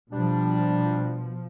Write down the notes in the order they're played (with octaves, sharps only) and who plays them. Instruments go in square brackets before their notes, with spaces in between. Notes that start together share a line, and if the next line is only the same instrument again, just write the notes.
[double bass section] B2 F3 [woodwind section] G3 D4